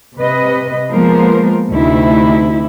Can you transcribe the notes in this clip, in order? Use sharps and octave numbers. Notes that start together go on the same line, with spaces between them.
C3 B4 D#5
F3 G#3 A#3 B3 A#4 C5
D2 C3 D#4 E4